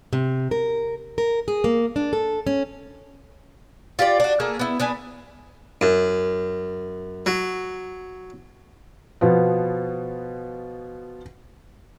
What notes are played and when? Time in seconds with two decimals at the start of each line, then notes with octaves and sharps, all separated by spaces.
0.13 C3
0.51 A#4
1.18 A#4
1.48 G#4
1.64 A#3
1.96 D4
2.13 A4
2.47 C#4
3.99 F4 G4 C#5 D5
4.20 D4 F#4
4.40 A3 A#3 G#4
4.59 B3 E4
4.80 B3 D4 B4 G#5
5.81 F#2
7.26 F#3
9.21 B2 F3 B3